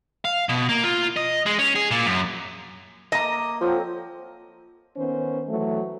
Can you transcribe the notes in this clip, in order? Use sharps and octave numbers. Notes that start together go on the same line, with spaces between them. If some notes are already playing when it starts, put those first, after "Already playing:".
F5
B2
A#3
F4
D#5
G#3
C#4
G#4
A#2
F#2
A#3 D#5 A5 A#5
F3 F#3 C4 A4
D#3 B3 C#4 C5
E3 F#3 A3